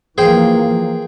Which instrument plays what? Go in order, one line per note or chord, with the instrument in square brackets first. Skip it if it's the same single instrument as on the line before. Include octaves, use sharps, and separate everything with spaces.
[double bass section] E3 F3 A#3 [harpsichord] G#4 C5 G5